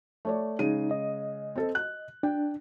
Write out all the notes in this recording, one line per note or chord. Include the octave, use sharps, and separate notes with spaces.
A3 C#5 D5
C#3 G#3 D#4 D#7
D#5
C4 A4
F#6
D4 G5